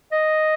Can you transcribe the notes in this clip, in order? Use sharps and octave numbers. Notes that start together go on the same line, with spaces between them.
D#5